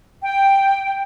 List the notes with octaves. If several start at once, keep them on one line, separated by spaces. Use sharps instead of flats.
G5